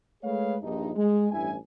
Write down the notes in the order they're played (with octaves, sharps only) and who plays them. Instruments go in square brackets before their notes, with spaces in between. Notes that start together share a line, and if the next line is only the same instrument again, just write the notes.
[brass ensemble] G#3 A3 G#4 B4 C#5 F5
A#1 G2 D#4
G#3
A1 G2 E4 G#5